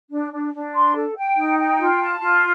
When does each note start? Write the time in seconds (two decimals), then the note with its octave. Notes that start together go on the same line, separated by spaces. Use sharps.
0.11 D4
0.32 D4
0.54 D4
0.74 C6
0.95 A4
1.16 G5
1.37 D#4
1.58 G5
1.79 F4
2.00 A5
2.21 F4